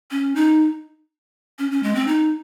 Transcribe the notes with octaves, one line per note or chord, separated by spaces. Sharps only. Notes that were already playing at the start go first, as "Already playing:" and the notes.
C#4
D#4
C#4
C#4
G#3
C4
D#4